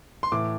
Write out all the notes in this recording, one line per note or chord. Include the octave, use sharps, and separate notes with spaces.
C6
A2 E3 D6